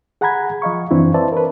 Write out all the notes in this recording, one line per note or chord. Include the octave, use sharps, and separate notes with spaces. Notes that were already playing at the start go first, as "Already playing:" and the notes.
G#4 F#5 G#5 A#5 B5 G#6
F3 D#5 F5 C#6
F#2 E3 C4 D4 E4
B4 C5 D5 E5 A5
A#4 B4